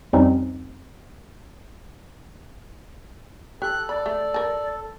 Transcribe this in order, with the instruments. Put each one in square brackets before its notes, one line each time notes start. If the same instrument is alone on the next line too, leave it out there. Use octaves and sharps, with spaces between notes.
[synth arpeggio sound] F2 G3 C4 C#4 D#4
[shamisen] G4 [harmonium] A4 [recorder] F#6
[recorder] D5 [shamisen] B5
[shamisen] A3
A#4 A5